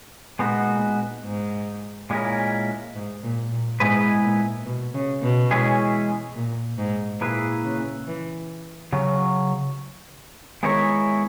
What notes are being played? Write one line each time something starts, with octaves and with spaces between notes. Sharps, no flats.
A#2 G#3 B3 D#4 F#4
A#2
G#2
A#2 G#3 C#4 E4 A#4
G#2
A#2
A#2
G#2 G#3 B3 E4 G#4 B4
A#2
B2
C#3
B2
E3 G#3 C#4 E4 G#4
A#2
G#2
A#2 A#3 E4 G#4 B4
C#3
E3
C#3 F#3 C#4
D#3 G#3 B3 E4 A#4 C#5